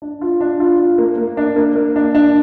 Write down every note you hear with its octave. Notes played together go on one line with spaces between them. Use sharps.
D4
F4
D4
F4
F4
A#3
A#3
D4
A#3
A#3
D4
D4